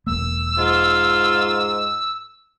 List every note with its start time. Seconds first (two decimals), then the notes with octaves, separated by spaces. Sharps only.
0.07 E1 A#3 E6
0.58 G#2 F4